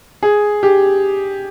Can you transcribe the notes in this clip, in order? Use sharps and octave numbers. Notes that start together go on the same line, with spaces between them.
G#4
G4